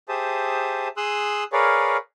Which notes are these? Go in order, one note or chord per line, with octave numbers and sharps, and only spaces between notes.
G4 G#4 C5 E5 A5 D#6
G#4 C6 D#6 E6 F#6
G#4 A#4 B4 C#5 D5 F5